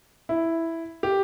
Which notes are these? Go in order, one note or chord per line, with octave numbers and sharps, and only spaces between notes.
E4
G4